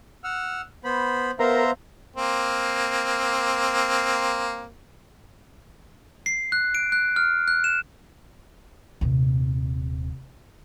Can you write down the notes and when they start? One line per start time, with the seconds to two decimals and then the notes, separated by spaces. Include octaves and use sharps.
0.24 F#5 E6 F6
0.84 B3 C5 B5
1.39 B3 A#4 C5 E5 F5 A#5 C6
2.16 A#3 C4
6.26 C7
6.52 F#6
6.75 D7
6.92 F#6
7.16 F6
7.48 F#6
7.64 E7
9.01 D#1 C3